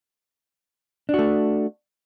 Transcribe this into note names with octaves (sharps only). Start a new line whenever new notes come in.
A3 D4 F#4